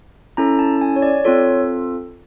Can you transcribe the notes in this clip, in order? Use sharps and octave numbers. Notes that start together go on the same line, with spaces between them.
C#4 E4 A4 A#5
A5
G#5
C#5
D5
C4 F4 A4 C#5